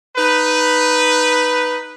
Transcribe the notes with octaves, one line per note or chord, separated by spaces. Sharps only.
D#4 B4